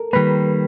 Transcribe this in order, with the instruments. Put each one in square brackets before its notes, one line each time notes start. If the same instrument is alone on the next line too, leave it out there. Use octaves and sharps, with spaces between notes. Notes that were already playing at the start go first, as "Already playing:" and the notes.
Already playing: [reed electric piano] A4 A#4
[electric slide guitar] D#3 G3 A#3 [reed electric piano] B4